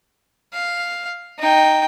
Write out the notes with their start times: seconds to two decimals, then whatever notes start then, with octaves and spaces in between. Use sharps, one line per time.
0.53 F5
1.39 D#4 G5